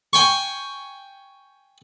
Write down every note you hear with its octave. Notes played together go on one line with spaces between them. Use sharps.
G5 G#5 C#6